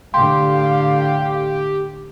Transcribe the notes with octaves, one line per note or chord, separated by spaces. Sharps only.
A2 D3 G4 F5 C6